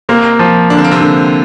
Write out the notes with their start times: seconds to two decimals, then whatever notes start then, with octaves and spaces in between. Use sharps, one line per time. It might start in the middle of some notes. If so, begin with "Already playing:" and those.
0.09 C3 A#3 C4
0.39 F3
0.70 D3 D4
0.78 C4
0.84 A#3
0.91 C3 C4
1.01 D3